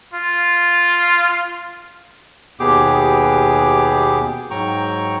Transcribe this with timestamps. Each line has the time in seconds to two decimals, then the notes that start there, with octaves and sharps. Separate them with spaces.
0.14 F4
2.60 D#2 B2 B3 G4 G#4 D6
4.51 G#2 F#3 G5 A#5 C#6